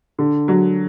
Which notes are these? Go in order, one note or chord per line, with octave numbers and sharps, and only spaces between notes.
D3
F#3